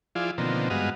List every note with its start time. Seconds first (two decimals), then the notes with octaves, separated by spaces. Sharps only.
0.15 F3 E4 F4 G#4 D5
0.38 B2 D3 D#3 F3 A#3 C4
0.70 G2 G#3 B3 F#4 D#5 F5